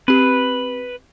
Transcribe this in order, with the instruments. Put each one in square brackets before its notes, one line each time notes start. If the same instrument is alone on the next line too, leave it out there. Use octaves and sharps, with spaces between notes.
[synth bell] C4 G4 [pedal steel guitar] B4